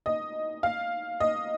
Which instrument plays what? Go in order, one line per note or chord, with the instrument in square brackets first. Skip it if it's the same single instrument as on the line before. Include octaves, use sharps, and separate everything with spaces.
[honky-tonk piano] D#5
F5
D#5